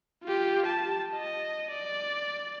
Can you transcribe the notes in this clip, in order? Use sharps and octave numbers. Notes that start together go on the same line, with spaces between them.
F4 G4
A5
D#5
D5